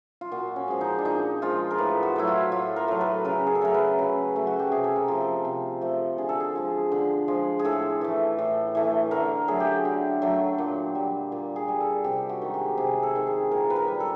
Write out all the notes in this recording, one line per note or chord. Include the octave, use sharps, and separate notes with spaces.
F4
A#2 F#4
C#4
F3 G#3
D#4
D4
A#2 D#4
F3 G#3 F4
A#4
A2 B4
F#4
F#3 A3 E4
F4
A2 F4
A#4
F#3 A3
B4
C#3 A#4
G#4
A4
F#3 A3 A#4
B4
C#3
F#3 A3
F#4
G4
C3 G#4
A4
A#4
F3 A3
A4
C3
F3 A3
D3 G#4
A4
G#4
F3 G#3
D3
F3 G#3
G#4
A2 A4
E3 A3
A2
E3 A3
D3 A#4
F#3 A3 G#4
G4
D3
F#3 A3
A#2
G3
A#2
G#4
G3
A4
C3 G4
F#4
D#3 G#3
G4
C3 G#4
A4
D#3 G#3
G#4
A#2 A#4
B4
A#4
G3
A4